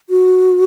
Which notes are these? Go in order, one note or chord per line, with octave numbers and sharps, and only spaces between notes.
F#4